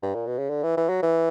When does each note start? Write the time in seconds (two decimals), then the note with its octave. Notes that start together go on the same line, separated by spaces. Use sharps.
0.02 G2
0.14 A#2
0.27 B2
0.38 C#3
0.49 D3
0.63 E3
0.77 E3
0.89 F#3
1.02 E3